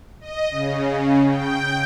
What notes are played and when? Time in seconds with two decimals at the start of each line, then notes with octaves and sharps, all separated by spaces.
0.21 D#5
0.51 C#3
1.26 G5